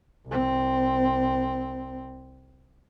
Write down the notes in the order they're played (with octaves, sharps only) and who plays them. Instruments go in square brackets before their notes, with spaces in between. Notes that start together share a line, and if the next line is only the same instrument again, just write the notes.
[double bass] C2 C4